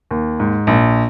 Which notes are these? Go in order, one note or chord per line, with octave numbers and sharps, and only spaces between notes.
D#2
G#2
A#1